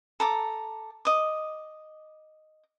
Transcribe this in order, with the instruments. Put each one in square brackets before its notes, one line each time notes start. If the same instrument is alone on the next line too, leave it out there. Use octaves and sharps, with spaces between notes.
[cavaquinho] A4 A#5 D6
D#5 D6